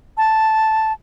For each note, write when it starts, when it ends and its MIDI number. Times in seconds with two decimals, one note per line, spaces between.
0.17 0.92 81